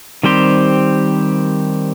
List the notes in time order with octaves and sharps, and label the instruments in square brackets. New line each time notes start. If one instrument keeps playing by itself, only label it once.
[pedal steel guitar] D#3 G3 C4 G4 C5